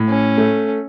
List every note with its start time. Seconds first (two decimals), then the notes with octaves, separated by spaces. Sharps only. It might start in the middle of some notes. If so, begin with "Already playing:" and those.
Already playing: A2
0.09 C#4
0.38 A3